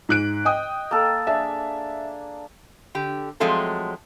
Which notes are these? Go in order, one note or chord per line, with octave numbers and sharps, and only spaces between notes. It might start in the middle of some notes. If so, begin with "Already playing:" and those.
G#2 F#6 D7
D#5 G5 D#6
A#3 A4
D4 G#4 E5
D3 G4
F3 F#3 G#3 A3 C4 A4